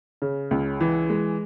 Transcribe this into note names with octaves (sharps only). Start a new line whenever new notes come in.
C#3
C#2
E3
G#3